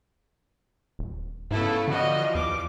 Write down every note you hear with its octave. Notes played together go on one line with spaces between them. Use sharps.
D#1
G#2 C#3 A3 B3 E4 A4
D3 E3 F3 G3 F#4 D#5
E2 D6